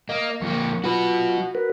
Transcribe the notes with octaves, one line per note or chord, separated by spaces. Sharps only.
A#3 D#5 F6
F2 A#3 C#6
F#3 F4 F#4 B4
F#4 A#4 B4